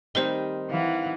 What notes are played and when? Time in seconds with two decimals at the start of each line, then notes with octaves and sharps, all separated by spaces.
0.15 D#3 G3 C4 C5 G7
0.71 E3 F5 F#5